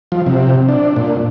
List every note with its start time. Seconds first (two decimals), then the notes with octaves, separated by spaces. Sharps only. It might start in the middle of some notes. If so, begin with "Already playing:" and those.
0.12 F3
0.26 C3
0.69 D4
0.96 A#2